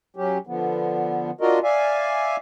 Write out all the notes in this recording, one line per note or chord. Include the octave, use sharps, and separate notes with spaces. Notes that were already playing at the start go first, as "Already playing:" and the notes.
F#3 C#4 G4
D3 F3 B3
D4 F4 F#4 A#4 D#5
D5 E5 F5 G#5